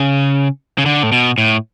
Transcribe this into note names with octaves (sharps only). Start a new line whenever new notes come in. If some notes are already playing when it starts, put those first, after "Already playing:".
Already playing: C#3
C#3
D3
A2
B2
A2